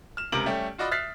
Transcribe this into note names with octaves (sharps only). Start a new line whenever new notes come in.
F6 E7
C#2 C3 A#4 D7 F#7
G3 A3 C#4 G4
F4 F#4 D5 D#5 B5 D#6
E5 F6 F#6 A6 B6 C7